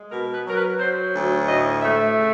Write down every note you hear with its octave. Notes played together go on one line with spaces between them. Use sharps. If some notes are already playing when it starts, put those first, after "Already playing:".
Already playing: G#3
B2 A#4
B4
F#3 A#4
B4
F#3 C5
D2
A2 D#5
A3 E5
C#3